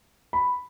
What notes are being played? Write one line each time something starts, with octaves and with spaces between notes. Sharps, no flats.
B5